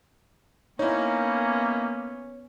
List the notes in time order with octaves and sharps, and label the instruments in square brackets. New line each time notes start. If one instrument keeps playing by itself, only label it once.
[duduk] A#3 [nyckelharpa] B3 C#4 [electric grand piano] D#4 E4 [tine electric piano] C#5